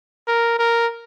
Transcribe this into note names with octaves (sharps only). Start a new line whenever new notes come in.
A#4
A#4